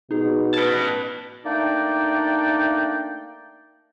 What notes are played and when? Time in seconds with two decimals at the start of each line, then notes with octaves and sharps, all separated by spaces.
0.11 B2 D#4 G#4
0.54 B4 A5 G#6 D7
1.45 A3 A#3 D4 D#4 D5 G5